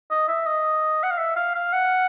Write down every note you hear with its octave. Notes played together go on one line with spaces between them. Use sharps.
D#5
E5
D#5
F#5
F5
E5
F5
F5
F#5